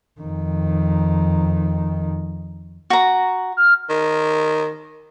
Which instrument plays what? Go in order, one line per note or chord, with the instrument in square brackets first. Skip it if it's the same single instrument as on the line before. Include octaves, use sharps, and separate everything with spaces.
[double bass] F2 D#3
[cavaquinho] F#4 A#5
[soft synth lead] F6
[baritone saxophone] D#3